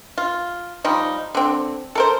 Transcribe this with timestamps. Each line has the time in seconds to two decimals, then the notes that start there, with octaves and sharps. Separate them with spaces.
0.18 F4
0.84 F3 G3 D#4
1.35 D3 C4
1.95 A4 A#4 C5